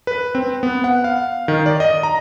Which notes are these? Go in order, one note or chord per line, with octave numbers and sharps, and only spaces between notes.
B4
C4
B3
F#5
F5
D#3
D5
D#5
A#5